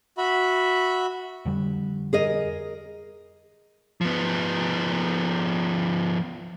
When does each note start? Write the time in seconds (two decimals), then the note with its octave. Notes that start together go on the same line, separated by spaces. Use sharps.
0.18 F#4 E5 B5
1.45 F2 D3 G3
2.13 G#4 A#4 D#5
4.01 F3 B3